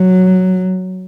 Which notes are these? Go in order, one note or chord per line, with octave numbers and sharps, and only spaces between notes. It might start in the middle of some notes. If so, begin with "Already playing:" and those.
Already playing: F#3